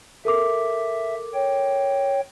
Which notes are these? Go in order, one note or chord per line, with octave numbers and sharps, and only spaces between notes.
A4 A#4 E5 D6
C#5 G5